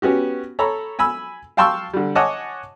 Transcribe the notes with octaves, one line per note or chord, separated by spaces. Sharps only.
B3 C#4 F#4 G4
A4 C#5 A#5 B5
G#5 B5 E6
F5 G5 A5 C6 C#6 E6
D3 G3
C#5 D#5 F#5 G#5 A5 D6